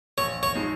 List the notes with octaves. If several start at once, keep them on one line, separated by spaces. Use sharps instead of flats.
A#1 C#5
C#5
F3 G#3 D#4